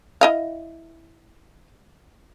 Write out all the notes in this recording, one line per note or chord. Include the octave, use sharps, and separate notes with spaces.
E4 D#5 F5